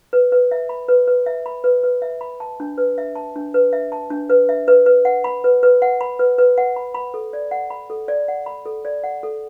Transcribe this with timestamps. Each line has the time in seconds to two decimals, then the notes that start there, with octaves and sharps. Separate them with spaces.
0.13 B4
0.32 B4
0.51 E5
0.69 B5
0.88 B4
1.07 B4
1.26 E5
1.46 B5
1.64 B4
1.84 B4
2.02 E5
2.21 B5
2.40 A5
2.60 D4
2.78 B4
2.98 E5
3.16 A5
3.36 D4
3.54 B4
3.73 E5
3.92 A5
4.10 D4
4.30 B4
4.49 E5
4.68 B4
4.86 B4
5.05 F#5
5.24 B5
5.44 B4
5.63 B4
5.82 F#5
6.01 B5
6.19 B4
6.38 B4
6.58 F#5
6.76 B5
6.95 B5
7.14 A4
7.33 D5
7.51 F#5
7.70 B5
7.90 A4
8.08 D5
8.28 F#5
8.46 B5
8.66 A4
8.85 D5
9.04 F#5
9.23 A4